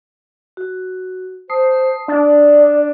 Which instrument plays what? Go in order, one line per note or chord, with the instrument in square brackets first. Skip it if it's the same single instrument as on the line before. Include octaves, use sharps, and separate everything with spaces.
[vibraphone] F#4
[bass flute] C5 [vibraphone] A5 D#6 [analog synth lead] C7
[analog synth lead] D4 [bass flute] D5